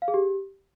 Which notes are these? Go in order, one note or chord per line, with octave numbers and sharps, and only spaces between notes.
F5
G#4
G4